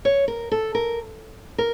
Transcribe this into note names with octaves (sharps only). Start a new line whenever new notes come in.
C#5
A#4
A4
A#4
A#4